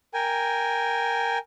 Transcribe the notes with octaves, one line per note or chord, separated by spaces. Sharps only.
A#4 G5 G#5